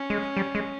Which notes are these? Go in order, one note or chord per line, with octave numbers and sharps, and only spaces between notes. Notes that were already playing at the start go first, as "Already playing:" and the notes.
Already playing: C#4
G#3
G3
G#3